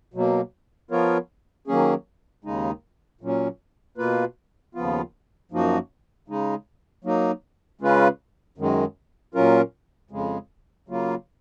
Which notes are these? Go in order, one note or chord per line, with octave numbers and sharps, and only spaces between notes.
B2 F#3 A#3
F3 B3 F4 A#4 C#5
D#3 F#3 A#3 C#4 G#4
D#2 C#3 G#3 D#4
A#2 F#3 C#4
B2 A#3 F4 B4
D#2 C#3 F3 B3 F4
F#2 F3 A#3 D#4 F#4
C#3 G#3 D#4
F#3 A#3 D#4
C#3 G#3 C#4 F4 B4
F#2 D#3 G#3
A#2 F#3 C#4 F4 A#4
F2 C#3 G#3
C#3 F#3 A#3 F4